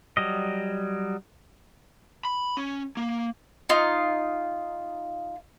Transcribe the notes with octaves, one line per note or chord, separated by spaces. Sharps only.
F#3 G3 D#5
B5
C#4
A#3
D#4 F4